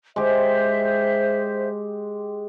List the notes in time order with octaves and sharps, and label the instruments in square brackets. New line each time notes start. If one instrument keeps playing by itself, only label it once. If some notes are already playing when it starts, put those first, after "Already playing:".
[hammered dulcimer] G#3 G4 [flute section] C5 E5